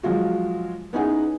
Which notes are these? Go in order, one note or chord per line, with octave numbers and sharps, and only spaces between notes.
F3 F#3 G#3 F4 F#4
B3 C#4 D#4 E4 G#4 F#5